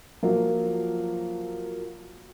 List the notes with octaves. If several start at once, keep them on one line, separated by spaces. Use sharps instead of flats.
F3 F#3 A#3 F4